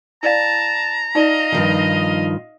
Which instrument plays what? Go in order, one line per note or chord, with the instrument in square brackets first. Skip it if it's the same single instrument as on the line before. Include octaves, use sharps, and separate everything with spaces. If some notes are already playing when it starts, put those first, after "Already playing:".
[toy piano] E4 D5 F5 [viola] A5 [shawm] A#5
[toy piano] D#4 F4 D5 [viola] D#5 F5
[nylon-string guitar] G2 D#3 F3